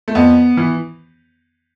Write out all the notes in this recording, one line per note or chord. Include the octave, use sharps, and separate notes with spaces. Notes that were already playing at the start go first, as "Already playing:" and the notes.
A3
F2 B3
E3